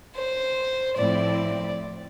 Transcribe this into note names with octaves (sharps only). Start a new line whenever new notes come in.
C5
A2 F3 C4 E4 D5